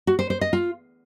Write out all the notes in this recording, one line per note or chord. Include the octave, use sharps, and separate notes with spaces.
F#4
C5
C5
D#5
F4